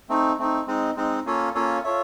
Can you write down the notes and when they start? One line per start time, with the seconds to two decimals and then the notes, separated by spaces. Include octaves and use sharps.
0.09 A3 C4 D#4
0.39 A3 C4 D#4
0.67 G#3 C4 D#4
0.96 G#3 C4 D#4
1.26 A#3 C#4 F4 A4 C#5
1.55 A#3 C#4 F4 A4 C#5
1.84 F4 A4 C#5 E5